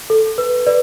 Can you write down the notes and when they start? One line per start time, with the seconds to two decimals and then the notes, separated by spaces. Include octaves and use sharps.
0.10 A4
0.38 B4
0.66 B4 D5